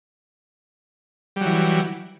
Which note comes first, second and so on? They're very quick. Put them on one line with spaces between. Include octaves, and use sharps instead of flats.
G3 F#3 E3